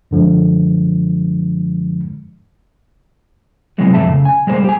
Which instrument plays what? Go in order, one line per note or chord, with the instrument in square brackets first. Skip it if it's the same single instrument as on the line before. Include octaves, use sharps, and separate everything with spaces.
[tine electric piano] F#2 D3 F3 G#3
[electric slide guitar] C3 E3 F#3 G#3 B3
F2 A2 E3 A3 E5 A5
C#3
G#5
G3 G#3 A#3 C5
G4 G#5